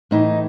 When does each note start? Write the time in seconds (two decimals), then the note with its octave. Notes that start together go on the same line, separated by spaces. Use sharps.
0.11 A2 E3 D#4